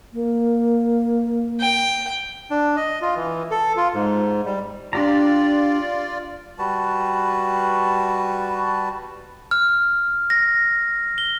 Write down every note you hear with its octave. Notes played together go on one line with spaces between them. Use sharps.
A#3
G5
D4
D#5
F4
E3
A4
F4
G#2
G3
D4 F4 G4 D5 A#5
G3 F#4 B4 A5
F6
A#6
G7